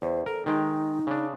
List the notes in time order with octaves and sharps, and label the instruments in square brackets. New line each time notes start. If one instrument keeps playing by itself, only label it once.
[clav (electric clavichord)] E2 [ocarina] C5
[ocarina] A4 [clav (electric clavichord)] A#4
[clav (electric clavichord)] D#3 G#3 G5 [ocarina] D#4
[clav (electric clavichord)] C#3 D4